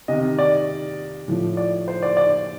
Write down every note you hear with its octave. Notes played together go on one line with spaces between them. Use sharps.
C3 D#3 D#5
D5
A2 F3
D5
C5
D5
D5